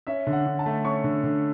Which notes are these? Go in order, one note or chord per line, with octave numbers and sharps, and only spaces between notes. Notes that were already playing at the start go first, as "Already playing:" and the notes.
C#4 E5
D3
F#5
D3
A5
A3
C#4 C#6
D3
D3